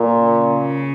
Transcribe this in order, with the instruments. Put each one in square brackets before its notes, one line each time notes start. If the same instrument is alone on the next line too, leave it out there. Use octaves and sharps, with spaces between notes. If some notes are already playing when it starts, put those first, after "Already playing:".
Already playing: [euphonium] A#2
[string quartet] C#3